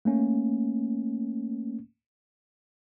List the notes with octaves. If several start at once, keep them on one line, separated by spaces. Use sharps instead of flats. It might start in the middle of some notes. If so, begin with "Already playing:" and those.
A3 A#3 C#4